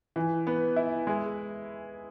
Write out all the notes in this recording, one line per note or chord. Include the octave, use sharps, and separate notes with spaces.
E3
B3
E4
G#3